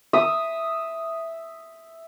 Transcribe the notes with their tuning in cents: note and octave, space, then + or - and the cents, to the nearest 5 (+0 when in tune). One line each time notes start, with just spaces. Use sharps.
E5 +0 D#6 +0